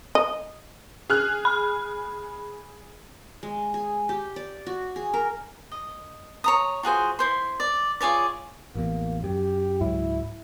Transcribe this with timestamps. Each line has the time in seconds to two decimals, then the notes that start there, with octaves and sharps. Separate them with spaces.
0.15 D#5
1.10 G#4 F6 F#6
1.45 B5
3.43 G#3
3.74 G#4
4.09 G4
4.36 D5
4.66 F#4
4.96 G#4
5.14 A#4
5.72 D#5
6.44 C#5 A#5 D#6
6.83 F4 F#4 G#4 C5
7.19 E4 C5 C6
7.60 D5
8.01 F4 G#4 C#5 D5
8.75 A1 E2 A#3
9.24 F#2 G4
9.81 C#2 G#2 F#3 E4